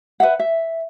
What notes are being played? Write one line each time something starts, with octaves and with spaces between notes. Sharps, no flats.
B4 E5 F#5
E5